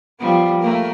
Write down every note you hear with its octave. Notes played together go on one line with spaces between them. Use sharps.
F3 G3 B3
A3 A#3 A#4